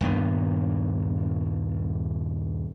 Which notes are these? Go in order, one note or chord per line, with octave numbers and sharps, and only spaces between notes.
D#1 G2 B3